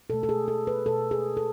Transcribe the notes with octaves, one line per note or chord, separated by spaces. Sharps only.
B2 A3 A4
A4
G#4
A4
B4
B2 A3 A4
G#4
A4